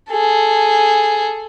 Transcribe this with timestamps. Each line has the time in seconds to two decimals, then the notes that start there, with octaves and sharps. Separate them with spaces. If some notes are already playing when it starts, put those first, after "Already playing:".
0.11 G#4 A4